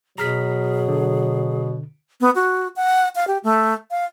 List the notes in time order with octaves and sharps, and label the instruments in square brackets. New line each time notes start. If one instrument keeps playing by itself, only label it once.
[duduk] B2 [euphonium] F#3 [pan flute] G#4 [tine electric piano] A#5 F6 B6
[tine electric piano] D3
[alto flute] B3
F#4
F#5
F5
G4
A3
F5